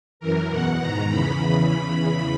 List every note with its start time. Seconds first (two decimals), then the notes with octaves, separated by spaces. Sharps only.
0.20 F#2 E3 A#4
0.50 E2 B2 F#5
0.79 G#2 D#3 A#5
1.09 E2 C#3 E3 B5